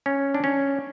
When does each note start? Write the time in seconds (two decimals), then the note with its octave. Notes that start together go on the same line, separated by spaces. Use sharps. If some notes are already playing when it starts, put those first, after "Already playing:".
0.06 C#4
0.34 D4
0.44 C#4